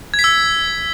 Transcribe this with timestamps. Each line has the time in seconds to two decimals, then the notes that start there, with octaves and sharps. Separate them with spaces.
0.14 G#6
0.19 B6
0.24 E6